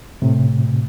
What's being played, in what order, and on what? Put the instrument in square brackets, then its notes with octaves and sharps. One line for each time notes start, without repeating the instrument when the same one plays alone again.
[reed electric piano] A2 C3